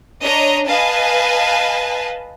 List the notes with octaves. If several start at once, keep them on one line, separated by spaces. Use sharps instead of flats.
D4 C#5 D#5 A#5
B4 D#5 F5 G#5 A5